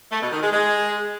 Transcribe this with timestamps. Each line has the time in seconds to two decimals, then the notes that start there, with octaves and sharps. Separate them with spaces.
0.11 A3
0.21 B2
0.32 D#3
0.42 G#3
0.53 G#3